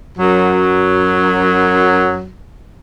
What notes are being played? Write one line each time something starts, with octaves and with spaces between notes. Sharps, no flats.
F#2 F#3